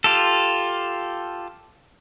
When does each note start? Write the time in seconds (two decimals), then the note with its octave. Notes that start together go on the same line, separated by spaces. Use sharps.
0.04 F4 G4 A4